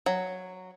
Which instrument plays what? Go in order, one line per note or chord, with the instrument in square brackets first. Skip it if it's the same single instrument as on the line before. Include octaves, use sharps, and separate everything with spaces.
[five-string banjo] F#3